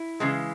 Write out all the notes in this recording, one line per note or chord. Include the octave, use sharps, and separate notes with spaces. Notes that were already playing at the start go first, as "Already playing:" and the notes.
Already playing: E4
C#3 E3 G#3